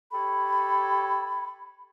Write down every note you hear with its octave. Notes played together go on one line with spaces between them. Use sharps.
G4 A4 C#5 B5